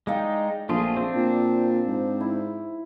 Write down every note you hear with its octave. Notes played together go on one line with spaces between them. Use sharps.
G#3 D#4 D5 F5 G5
A#1 F3 A3 F4 G#4
C4 D4
A#2
G#2
E4